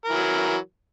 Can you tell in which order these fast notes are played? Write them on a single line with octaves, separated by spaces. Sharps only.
A#4 E3 F#3